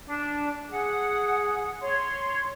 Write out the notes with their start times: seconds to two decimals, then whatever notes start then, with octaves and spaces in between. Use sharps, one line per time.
0.06 D4
0.71 G#4 F#5
1.81 C#5 C6